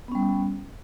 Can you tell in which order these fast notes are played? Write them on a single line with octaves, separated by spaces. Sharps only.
B3 C#4 G3